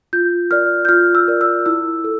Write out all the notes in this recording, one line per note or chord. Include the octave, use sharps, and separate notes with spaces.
F4 G6
A#4 D5 F6
G6
F4 F6
E6
A#4 D5
E6
E4 E6
A4